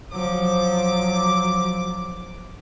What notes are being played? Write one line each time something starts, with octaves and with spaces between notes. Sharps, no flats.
F3 F#3 D6